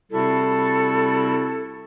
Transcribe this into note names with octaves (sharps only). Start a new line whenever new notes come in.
C3 G3 C4 E4 F#4 A4